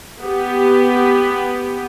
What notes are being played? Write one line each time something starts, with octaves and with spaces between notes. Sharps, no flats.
B3 G4